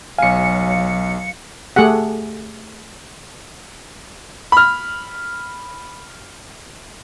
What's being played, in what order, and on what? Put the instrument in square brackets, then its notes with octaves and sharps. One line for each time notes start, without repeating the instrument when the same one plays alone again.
[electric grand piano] B1 G#5 [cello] F#3 [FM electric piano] F5 C#7
[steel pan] A3 G4 G#4 F#5
[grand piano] B5 F6